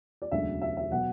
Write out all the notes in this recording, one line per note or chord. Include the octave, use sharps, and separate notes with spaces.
D5
E1 D2 C#3 F#3 E5
E5
E5
B2 F#3 F#5